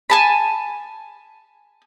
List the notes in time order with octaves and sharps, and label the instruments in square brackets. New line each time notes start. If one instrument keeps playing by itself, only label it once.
[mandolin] G#5 A5 B5